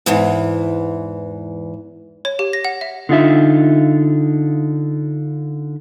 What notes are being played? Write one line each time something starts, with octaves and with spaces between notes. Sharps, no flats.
E2 G#2 E3
C#5
G4
A#6
F#5
E5
D3 D#4 F4 E5